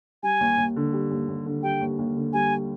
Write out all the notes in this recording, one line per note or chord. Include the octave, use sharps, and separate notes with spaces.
G3 G#5
D#2
D#2
D3
G3
D#2
D#2
D3
G3 G5
D#2
D#2
D3
G3 G#5